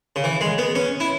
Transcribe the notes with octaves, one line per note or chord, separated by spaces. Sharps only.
C#3
E3
G#3
B3
C#4
E4